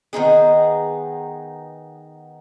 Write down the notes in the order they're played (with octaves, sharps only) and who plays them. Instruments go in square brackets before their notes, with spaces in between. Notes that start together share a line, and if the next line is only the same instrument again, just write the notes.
[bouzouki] D#3 B3 D#4 G#4